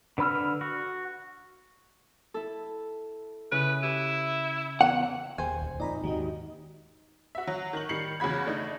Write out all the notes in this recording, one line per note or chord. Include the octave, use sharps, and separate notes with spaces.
D3 B4 B5 E6 F6
F#4
E4 A4
C#3 E4 B4
E4 G4
E2 F#5
D#1 G#1 D#2 G#4 C5 G5 G#5
D2
F2 A#2 D#4 D5 A#5 B5
D#2 G#2 D#3 F#4 G4 D#5
F#4 E5
F#3
D#3 C#6 F#7
D#3 G3 C7 C#7 F#7
E2 C#3 F#4 B5 G#6
A3 D4 D#4